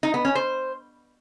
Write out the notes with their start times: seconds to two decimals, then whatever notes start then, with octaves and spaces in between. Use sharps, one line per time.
0.03 D#4
0.14 B3
0.25 C#4
0.35 C5